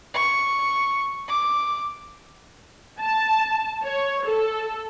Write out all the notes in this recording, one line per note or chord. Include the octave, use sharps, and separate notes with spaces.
C#6
D6
A5
C#5
A4